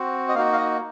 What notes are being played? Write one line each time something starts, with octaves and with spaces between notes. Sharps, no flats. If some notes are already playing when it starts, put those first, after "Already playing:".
Already playing: C4 F#4
D#5
A#3 D#4 F#4 F5
F5
D#5